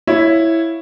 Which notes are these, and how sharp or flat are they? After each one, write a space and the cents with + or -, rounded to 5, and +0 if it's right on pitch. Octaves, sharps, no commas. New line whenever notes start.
E4 +0 C#5 +0 F5 +5